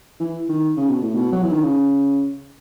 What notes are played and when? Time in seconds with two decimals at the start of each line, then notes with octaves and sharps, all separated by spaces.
0.20 E3
0.49 D#3
0.77 C#3
0.89 B2
1.02 A2
1.15 B2
1.32 F#3
1.42 E3
1.52 D#3
1.62 C#3